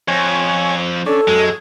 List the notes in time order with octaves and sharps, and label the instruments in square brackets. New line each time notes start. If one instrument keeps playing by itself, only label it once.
[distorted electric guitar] F2 [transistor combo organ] C#5 G#5
[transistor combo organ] C#4 D4 [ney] A4
[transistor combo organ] F#2 [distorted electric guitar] G#3